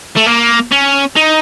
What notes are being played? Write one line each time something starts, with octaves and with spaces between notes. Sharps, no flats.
A3
A#3
C#4
D#4